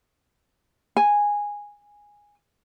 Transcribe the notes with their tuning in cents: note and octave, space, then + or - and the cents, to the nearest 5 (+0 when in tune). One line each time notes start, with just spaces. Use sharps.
G#5 -10